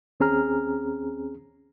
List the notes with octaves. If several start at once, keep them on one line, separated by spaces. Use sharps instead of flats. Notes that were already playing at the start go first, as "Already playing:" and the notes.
D#2 C4 C#4 G#4 A#5 F6